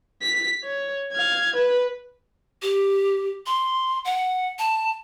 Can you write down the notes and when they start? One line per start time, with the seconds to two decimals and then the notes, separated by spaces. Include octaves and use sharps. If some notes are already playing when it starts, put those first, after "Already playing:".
0.22 B6
0.64 C#5
1.12 F5 G#6
1.56 B4
2.62 G4
3.46 C6
4.05 F#5
4.59 A5